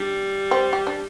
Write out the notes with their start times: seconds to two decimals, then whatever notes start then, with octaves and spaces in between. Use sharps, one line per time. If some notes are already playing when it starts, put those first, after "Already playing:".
Already playing: G3 D4
0.51 C4
0.73 G4
0.87 D4